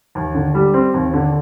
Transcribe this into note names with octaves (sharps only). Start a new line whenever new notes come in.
D#2
D3
G3
C4
D#2
D3